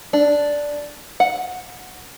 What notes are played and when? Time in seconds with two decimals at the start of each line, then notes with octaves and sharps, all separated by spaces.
0.13 D4
1.20 F#5